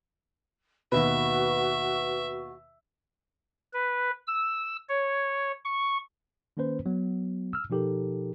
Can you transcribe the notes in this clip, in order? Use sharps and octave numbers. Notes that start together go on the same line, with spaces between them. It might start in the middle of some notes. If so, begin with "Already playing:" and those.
D#2 B2 F#4 B4 E5
B4
E6
C#5
C#6
D#3 A#3 C#4 B4 C5
F#3 B3
E6 F6
B2 F3 D#4 G4 A4 A#4